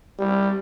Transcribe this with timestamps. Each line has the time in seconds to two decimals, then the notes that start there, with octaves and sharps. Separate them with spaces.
0.19 G3